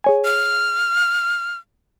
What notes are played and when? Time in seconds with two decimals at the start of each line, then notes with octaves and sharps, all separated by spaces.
0.04 G#4 C#5 G#5
0.25 F6